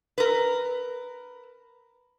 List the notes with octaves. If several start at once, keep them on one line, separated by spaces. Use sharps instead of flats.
A#4 B4